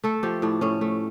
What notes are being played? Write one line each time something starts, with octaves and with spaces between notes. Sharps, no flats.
A3 A4
F3 G4
A2 D4
A2 C#4
A3